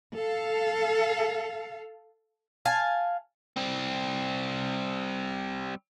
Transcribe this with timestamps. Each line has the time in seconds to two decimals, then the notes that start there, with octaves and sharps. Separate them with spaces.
0.14 A4 F5
2.65 F5 G#5 A5
3.57 G3 C4